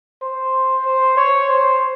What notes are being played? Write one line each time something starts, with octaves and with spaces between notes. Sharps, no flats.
C5
C5
C#5
C5